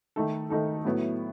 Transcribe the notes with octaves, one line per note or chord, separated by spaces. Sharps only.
D#3 A3 D#4 A4
D#3 A3 D#4 A4
A2 F#3 B3 E4